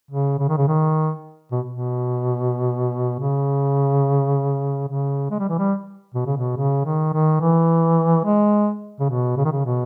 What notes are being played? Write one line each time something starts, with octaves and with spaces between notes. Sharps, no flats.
C#3
C#3
D#3
C#3
D#3
B2
B2
C#3
C#3
G#3
G3
E3
G3
B2
C#3
B2
C#3
D#3
D#3
E3
G#3
C#3
B2
C#3
D#3
C#3
B2